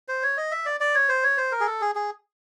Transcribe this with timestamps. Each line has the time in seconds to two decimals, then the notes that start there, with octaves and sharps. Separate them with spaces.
0.08 C5
0.23 C#5
0.37 D#5
0.51 E5
0.65 D5
0.80 D5
0.95 C#5
1.09 C5
1.24 C#5
1.37 C5
1.52 A#4
1.60 G#4
1.67 A4
1.81 G#4
1.95 G#4